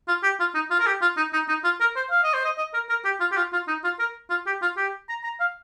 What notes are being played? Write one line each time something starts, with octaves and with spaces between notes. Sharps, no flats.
F4
G4
F4
D#4
F4
A#4
G4
F4
D#4
D#4
D#4
F4
A#4
C5
F5
D#5
C5
D#5
D#5
A#4
A#4
G4
F4
G4
F4
F4
D#4
F4
A#4
F4
G4
F4
G4
A#5
A#5
F5